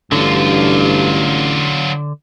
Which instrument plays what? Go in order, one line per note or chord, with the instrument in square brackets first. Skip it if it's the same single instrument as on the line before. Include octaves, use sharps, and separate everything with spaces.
[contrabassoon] A1 [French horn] G2 [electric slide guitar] D3 [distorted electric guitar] F#3 F4